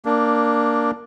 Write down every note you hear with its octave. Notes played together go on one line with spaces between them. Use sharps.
A#3 D4